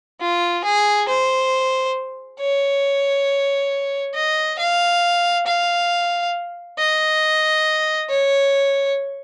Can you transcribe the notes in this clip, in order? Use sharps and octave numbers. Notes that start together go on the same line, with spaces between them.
F4
G#4
C5
C#5
D#5
F5
F5
D#5
C#5